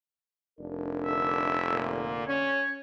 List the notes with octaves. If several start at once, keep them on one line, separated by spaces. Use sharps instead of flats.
F1 D4 A#4
D3 E5
A#2 D3
C#4 C#5